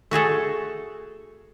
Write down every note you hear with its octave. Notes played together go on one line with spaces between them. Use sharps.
A3 F#4 G#4 A4